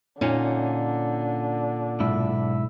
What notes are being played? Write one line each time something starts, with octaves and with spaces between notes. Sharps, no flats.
A#2 D3 C#4 D#4
B1 G#2 E4